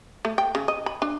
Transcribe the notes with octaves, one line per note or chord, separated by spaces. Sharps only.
A3
G5
C#3
D#5
B5
D4